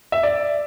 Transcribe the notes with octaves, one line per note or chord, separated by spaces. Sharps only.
E5
D5